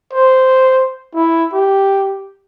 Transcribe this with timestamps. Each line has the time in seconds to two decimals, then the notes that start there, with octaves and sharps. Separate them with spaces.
0.13 C5
1.15 E4
1.53 G4